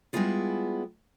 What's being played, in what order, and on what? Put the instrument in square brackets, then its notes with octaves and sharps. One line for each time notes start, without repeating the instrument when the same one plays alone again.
[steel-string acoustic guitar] G3 G#3 B3 E4 F4 G#4